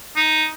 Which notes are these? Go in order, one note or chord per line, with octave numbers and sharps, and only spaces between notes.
D#4